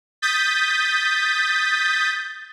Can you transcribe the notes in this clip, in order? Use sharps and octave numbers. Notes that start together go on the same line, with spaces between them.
D#6 G6 A6 B6